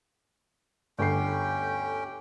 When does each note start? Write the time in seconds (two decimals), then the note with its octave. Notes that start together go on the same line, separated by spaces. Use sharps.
0.99 G1 D2 C#4 G4 G5 C7